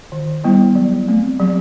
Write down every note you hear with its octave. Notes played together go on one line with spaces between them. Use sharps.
D#3
G3 B3 E4
F#3
A3 C4
F#3